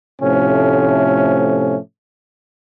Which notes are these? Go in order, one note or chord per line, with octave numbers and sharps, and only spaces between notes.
A2 C3 F3 A3 C#4